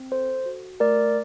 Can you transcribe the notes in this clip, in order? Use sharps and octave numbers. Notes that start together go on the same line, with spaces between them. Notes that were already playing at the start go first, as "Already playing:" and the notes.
Already playing: C4
A4 C5
F#4
A3 A#4 D5